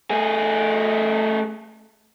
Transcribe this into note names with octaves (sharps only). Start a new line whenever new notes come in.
A3 G#4